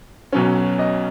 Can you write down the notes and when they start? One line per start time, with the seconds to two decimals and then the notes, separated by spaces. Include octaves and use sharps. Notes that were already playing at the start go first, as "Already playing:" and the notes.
0.32 B1 B2 F#3 C#4
0.79 D#5